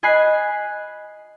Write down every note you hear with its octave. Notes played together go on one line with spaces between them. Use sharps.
D#5 G#5 B5 F#6 C7